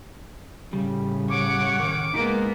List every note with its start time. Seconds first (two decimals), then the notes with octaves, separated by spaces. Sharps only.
0.73 A2 C#3 G3
1.30 C#5 F#5 D6
1.80 D#3 A#4 D6
2.14 G#3 A#3 B3 D#4